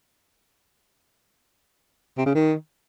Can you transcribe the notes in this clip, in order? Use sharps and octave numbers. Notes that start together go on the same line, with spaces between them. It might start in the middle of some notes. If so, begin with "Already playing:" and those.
C3
C#3
D#3